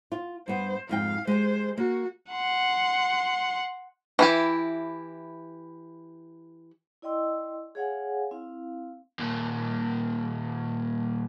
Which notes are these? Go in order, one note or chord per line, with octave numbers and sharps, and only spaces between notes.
F4
G2 B3 C5
F2 G#2 F5 G5
G#3 G4 C5
A#3 F#4
F#5 C6
E3 E4 G4
E4 D5 D#5 G5 C6 E6
G#4 C#5 F5 F#5 G#5
C4 E4 F5
D#2 A#2